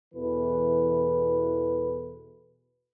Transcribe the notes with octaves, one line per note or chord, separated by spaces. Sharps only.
E2 B2 E3 A4 B4